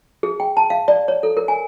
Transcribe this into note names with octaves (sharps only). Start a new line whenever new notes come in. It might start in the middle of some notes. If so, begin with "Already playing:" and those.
G#4
G5
A5
F5
D5
C#5
A4
A#4
G#5